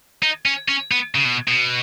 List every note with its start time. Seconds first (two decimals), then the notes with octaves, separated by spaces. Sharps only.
0.23 D#4
0.46 C#4
0.68 C#4
0.91 B3
1.15 C#3
1.25 B2
1.48 B2